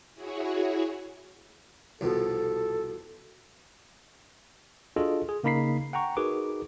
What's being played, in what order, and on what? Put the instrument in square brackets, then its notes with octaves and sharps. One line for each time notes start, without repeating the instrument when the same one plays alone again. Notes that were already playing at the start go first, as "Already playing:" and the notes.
[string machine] E4 F#4 G#4 C#5
[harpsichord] C2 F2 B2 [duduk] A4
[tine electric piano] D4 F4 F#4 G#4 A4 D#5
G#4
C#3 A#3 D#4 B5 B6 C7
F#5 G5 A#5 C#6
D#4 F#4 G#4 A#4 B4 D6